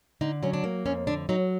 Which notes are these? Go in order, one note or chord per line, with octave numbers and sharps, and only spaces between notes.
D3 D#4
F#3 C#4
D4
A#3
F2 C#4
D3 D4
F#3 D#4